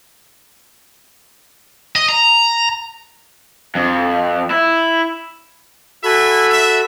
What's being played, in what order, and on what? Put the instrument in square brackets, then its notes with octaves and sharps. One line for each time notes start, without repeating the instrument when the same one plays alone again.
[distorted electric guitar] D#5
A#5
[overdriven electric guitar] F2
E4
[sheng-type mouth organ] F#4 A4 B5 [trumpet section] E5 G#5
[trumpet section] E5